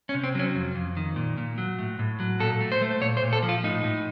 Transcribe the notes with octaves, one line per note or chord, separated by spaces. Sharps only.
C#4
C3
C4
F#3 C#4
F2
F2
D#3
A#2
A#2
F#3
A2
A2
F#3
A#2 A4
A3
C5
A3
A#2 C#5
C5
A#2
A4
F3
F4
A2 D#4
A2